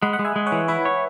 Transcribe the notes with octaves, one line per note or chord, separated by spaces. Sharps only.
G#3 F#5 B5
F#5
G#3
E5 G#5
G#3
C#5 F#5
E3
E4 B4 E5
C#5